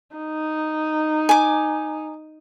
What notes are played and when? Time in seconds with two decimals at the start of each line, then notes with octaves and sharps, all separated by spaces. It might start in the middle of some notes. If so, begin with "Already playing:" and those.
0.16 D#4
1.29 G#5 D6